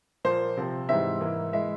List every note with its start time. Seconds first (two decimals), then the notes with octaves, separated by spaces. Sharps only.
0.25 A#2 F3 A#3 C5
0.57 C3 F3 C4
0.89 G#2 E3 G3 C4 E5
1.21 G#2 E3 A#3 E4
1.53 E3 G#3 E4 E5